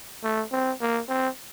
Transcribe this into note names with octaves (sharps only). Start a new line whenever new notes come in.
A3
C4
A#3
C4